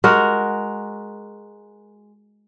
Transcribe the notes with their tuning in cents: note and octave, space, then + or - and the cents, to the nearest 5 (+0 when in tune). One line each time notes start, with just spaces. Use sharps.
G#3 +0 F#4 +0 A#4 +0